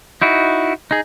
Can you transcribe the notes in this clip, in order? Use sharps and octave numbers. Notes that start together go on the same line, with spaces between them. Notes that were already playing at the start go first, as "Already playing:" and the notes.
D#4 E4 F#4
D#4 G#4